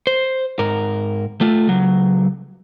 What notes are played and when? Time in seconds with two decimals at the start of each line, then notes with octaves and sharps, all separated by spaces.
0.07 C5
0.59 G#2 A#4
1.41 A3 F4
1.67 C#2 F#3